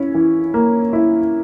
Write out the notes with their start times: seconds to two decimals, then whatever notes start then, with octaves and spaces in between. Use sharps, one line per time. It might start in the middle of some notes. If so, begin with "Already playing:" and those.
Already playing: C#4 E4
0.14 E3
0.54 A#3
0.93 E4